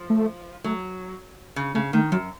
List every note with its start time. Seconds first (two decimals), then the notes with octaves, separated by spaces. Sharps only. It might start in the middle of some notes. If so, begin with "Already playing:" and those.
Already playing: F3
0.10 A3
0.64 F#3 A3
1.56 C#3
1.74 C#3 A3
1.93 D#3 A3
2.12 F#2 F#3